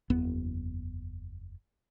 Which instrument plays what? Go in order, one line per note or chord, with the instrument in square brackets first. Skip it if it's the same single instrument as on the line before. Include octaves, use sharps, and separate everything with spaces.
[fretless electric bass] F#1 E2 B3